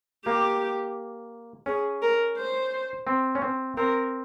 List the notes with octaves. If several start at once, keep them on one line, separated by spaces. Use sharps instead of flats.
A#3 G4
C#4 G#4
A#4
C5
C4
C#4
C4
C4 A#4